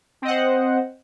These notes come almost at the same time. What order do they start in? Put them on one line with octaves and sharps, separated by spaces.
C4 D#5 F#5 C5